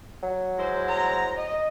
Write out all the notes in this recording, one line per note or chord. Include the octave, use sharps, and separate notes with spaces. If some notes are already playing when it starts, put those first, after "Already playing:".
F#3
G#3 E4 C5
A#5
D#5